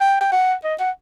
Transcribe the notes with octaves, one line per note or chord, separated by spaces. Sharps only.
G5
G5
F#5
D#5
F#5